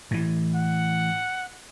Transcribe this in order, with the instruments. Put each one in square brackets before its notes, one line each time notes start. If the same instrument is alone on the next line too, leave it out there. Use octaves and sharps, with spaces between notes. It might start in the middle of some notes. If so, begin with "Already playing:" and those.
[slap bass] A2 E3
[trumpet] F#5